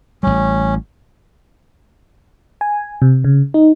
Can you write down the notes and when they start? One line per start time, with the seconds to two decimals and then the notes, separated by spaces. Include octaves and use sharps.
0.23 A1 G3 C#4
2.61 G#5
3.02 C3
3.24 C#3
3.54 D#4